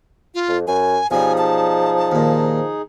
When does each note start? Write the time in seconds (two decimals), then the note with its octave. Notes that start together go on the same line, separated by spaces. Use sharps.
0.35 F4
0.49 F2
0.67 F#2 G#5
1.11 B1 F3 G3 D#4 G#4 G#5
1.38 A5
2.12 D#2 A#2